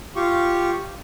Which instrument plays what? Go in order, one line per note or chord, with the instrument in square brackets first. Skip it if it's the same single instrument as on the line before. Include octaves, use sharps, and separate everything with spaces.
[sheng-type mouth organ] F4 G4 C#6